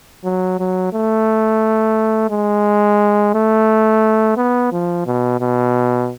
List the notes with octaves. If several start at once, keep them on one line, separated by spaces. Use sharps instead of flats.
F#3
F#3
A3
G#3
A3
B3
F3
B2
B2